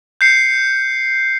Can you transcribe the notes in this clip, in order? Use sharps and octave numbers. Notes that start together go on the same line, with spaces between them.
G6 C7 C#7